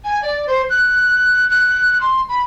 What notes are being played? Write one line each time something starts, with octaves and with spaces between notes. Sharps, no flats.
G#5
D5
C5
F#6
F#6
C6
B5